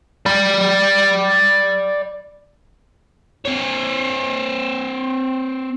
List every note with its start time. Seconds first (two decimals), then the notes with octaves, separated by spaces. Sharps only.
0.26 D5 B5
3.45 C4 C#5